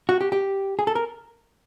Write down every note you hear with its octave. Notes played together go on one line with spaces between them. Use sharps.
F#4
G4
G4
G#4
A4
A#4